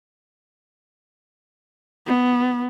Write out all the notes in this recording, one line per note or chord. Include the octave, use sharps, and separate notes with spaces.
B3